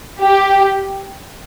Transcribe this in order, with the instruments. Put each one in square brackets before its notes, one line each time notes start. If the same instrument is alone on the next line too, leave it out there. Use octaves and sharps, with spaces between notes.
[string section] G4